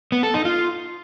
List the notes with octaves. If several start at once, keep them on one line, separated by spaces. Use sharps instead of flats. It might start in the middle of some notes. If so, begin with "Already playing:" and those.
B3
A4
D#4
F4